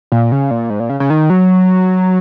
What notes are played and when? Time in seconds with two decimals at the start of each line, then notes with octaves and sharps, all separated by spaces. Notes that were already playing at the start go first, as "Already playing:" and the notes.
0.12 A#2
0.32 C#3
0.51 A#2
0.70 G#2
0.80 A#2
0.90 C#3
1.00 C#3
1.10 D#3
1.30 F#3